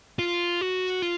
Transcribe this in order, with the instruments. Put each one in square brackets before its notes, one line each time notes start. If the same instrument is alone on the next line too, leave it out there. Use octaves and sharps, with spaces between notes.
[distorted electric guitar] F4
F#4
F4